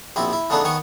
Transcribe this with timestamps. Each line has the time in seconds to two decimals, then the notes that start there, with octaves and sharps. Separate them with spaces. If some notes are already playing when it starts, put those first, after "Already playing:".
0.16 A#1 B2 C4 E4 G4
0.33 E4
0.50 C#3 E3 A3 B3 D4 D#4
0.64 D#3 B3 C#5 G#5